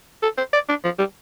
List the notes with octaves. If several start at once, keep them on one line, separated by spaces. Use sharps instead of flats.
A4
C5
D5
D4
F3
G3